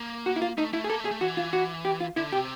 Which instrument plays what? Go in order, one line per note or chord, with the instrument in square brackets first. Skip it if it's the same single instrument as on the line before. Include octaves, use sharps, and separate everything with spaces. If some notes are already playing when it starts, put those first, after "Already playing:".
Already playing: [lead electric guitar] A#3
[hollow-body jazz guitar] F#4
E4
F4
[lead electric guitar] A3 [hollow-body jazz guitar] D#4
[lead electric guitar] A3 [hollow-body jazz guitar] E4
[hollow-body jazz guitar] G#4
[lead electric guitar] A#3 [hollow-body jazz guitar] A4
[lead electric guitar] A3
[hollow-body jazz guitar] G#4
[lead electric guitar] A3
[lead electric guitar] E3 [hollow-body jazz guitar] F#4
[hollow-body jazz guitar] F4
F#4
G4
F4
[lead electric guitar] D3 [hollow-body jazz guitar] E4
[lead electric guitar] C3 [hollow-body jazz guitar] G4